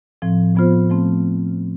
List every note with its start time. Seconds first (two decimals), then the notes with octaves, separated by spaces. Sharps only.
0.22 A2 F3 C4
0.55 A2 F3 B3 F4 C5
0.90 F3 A3 C4